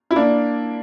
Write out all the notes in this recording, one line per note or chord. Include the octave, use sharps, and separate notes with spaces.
E4
A#3 D4